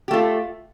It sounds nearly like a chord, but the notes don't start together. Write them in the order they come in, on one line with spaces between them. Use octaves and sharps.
G4 A3 F4